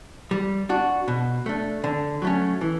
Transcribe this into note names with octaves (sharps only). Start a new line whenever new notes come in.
G3
D4 F#4
B2
A3 D4
D3
F#3 A3 C#4
E3